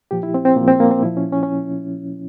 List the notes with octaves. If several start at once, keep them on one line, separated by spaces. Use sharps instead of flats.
A#2 F3 G4
E4
C4
C4
A#2 F3 A#3
C4
A#3
C4
A#2 F3 E4
C#4
C#4
C#4